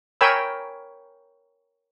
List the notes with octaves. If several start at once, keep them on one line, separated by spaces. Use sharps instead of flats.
A#4 C#5 G5 G#5 B5 E6